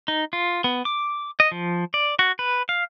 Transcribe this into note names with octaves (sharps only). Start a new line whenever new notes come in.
D#4
F4
B3
D6
D#5
F3
D5
F#4
B4
F5